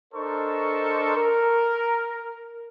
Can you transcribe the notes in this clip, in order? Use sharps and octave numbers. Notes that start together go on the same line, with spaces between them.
D4 A4 A#4 C5 D#5 C#6
A#4